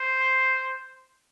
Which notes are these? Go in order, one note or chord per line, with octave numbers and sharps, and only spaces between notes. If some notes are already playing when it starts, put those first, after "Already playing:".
Already playing: C5